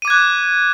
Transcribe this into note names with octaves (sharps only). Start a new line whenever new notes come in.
D6 F#6 G#6 D#7